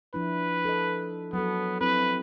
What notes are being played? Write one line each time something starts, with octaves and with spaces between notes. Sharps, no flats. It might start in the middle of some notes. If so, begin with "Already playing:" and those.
F3 D4 E4 B4
A4 D#5
F#3 B3 A4
C4 E4 B4